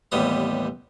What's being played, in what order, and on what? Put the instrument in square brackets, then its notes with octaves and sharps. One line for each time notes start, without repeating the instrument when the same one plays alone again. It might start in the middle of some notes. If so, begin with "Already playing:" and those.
[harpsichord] A1 D#2 G3 B3 D#6